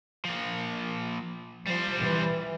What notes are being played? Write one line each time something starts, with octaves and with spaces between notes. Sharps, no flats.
F3 A#3
F3 G3 C5
E3